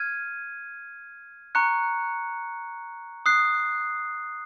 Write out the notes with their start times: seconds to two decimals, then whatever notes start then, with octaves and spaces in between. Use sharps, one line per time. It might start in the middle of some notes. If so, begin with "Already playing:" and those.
Already playing: F6 G#6 D#7
1.55 A#5 C#6 F#6 C#7
3.26 D#6 F#6 C7